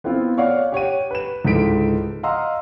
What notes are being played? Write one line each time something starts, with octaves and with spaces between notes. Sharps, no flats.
B3 C4 E4 F4
C#5 D5 F5 F#5
G4 C#5 F#5 D#7
B4 E7
C#2 G#2 D3 E4 B6 D7
D#5 F5 F#5 A#5 C6 E6